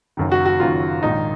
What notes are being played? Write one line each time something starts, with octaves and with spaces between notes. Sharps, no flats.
F#1 F#2 D#3
F#4
F#4
F#1 F#2 D#3 F4
A#1 G#2 D#3 D#4